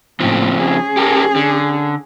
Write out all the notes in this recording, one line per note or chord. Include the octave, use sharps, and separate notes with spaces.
A2 C#3 F3 A#3 C4
C#4 G#4
G4 A4 A#4
D3